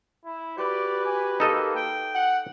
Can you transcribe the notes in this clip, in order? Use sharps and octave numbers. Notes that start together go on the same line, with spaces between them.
E4
F#4 G4 B4 D5
G#5
A#3 D#4 A4 D#5
G5
F#5